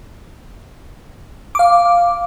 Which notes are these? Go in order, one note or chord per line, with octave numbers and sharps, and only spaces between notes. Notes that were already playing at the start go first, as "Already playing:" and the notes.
F5 D6